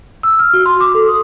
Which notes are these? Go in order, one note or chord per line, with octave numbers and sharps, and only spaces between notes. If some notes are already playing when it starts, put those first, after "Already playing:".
E6
F6
F#4
C6
D6
A4
D#6